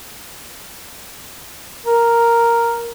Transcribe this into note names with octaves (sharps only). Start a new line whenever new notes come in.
A#4